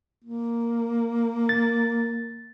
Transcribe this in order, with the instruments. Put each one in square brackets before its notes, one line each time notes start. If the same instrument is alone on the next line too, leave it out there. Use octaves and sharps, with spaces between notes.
[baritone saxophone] A#3
[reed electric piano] A6